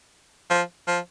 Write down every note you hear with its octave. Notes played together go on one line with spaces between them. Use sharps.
F3
F3